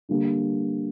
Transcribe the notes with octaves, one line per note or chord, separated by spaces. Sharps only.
D3 G3 A#3